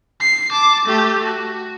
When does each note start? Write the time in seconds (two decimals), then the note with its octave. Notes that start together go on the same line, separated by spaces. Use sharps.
0.20 C7
0.51 A5 D6
0.85 A3 G4
1.23 F#4